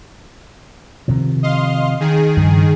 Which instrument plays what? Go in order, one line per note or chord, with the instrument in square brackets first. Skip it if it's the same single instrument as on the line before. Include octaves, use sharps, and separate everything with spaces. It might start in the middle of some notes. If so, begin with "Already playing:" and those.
[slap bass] C3 D#3 F3
[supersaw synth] D#5 F5 C6
D#3 G#4
[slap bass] G2 C#3 F3